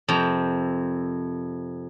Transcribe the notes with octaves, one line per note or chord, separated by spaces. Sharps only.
F2 C3 A#4 A#5